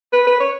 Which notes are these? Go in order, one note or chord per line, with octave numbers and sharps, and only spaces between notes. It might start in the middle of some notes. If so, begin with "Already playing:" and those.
B4
B4
C#5